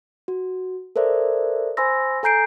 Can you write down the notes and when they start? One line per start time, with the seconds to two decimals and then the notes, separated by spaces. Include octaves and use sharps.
0.28 F#4
0.96 A4 A#4 C5 D5 E5
1.77 C5 G#5 B5 C6 E6 A#6
2.23 A4 G#5 A#5 G6 C7 D7